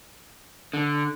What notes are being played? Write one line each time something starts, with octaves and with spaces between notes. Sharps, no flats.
D3